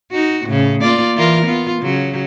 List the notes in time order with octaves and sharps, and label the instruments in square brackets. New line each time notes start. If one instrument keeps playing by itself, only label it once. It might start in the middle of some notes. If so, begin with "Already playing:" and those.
[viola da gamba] D#4 F#4
A2 C#3
A#3 F4 D5
E3 F4 A#4
B3 F4
C#3 F#3